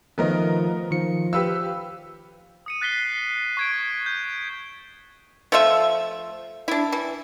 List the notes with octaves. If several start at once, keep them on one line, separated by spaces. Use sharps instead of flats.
D#3 F3 A3 B3 A#4 D#5
D#3 F3 C#7
G4 B4 F5 E6
D#6 C#7 D#7
F#6 A6 B6 C7 G7
C#6 G#6 D7
G6
F3 A3 F4 E5
D4 E4
E3